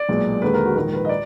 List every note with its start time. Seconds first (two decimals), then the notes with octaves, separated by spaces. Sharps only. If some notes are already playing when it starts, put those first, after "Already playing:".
Already playing: D5
0.09 B1 A#2 G#3
0.42 D#2 D3 G#3 B4
0.54 A#4
0.65 F#4
0.75 A#1 G#2 D#3 A#4
0.93 B4
1.05 D#5
1.09 D5